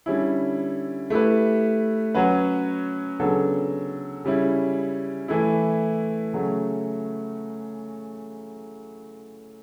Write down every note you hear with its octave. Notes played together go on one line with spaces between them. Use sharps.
D3 G3 C#4 E4
A3 E4 G4 B4
F#3 C#4 F#4 B4
C#3 F#3 B3 D4 A4
C#3 G3 C#4 E4
E3 A3 E4
C#3 F#3 A3